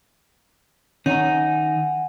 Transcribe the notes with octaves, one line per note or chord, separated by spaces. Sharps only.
D#3 C#4 D#4 F#5 G#5 A#5